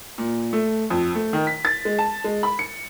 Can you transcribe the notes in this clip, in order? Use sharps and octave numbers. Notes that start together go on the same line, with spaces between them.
A#2
A3
F2
A3
D#3
B6
A6
G#3
A5
G#3
B5
C#7